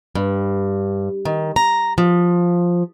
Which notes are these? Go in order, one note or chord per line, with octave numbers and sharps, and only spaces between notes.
G2
D#3
A#5
F3